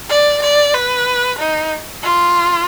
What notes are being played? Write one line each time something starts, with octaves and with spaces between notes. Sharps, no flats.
D5
D5
B4
D#4
F4